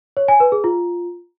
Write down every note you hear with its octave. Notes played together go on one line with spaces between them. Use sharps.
C#5
G#5
B4
G#4
F4